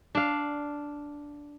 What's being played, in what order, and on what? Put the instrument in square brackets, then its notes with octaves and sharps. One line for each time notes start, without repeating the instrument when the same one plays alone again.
[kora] D4 F5